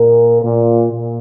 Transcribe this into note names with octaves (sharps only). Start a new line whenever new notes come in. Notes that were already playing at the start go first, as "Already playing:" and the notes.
Already playing: A#2 A#4
A#2
A#2